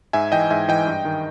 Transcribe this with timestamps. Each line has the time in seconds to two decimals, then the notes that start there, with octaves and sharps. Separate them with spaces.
0.13 G#2 E5 G#5
0.32 E3 D#5 G5
0.50 G#2 E5 G#5
0.68 E3 D#5 G5
0.87 G2
1.05 D#3